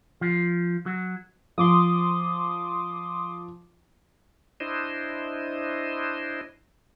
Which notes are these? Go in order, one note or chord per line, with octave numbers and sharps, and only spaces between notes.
F3
F#3
F3 C6 D6 D#6
D4 E4 C5 D#5